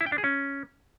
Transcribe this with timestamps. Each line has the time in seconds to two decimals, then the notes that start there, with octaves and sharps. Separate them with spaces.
0.01 E4
0.06 G5
0.12 D4
0.18 G#4
0.24 C#4